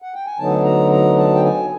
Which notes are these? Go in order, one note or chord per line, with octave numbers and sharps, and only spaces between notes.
F#5
G5
G#5
D2 D3 F#3 B3 D#4 A5
A#5
A#5
A5
G5
G#5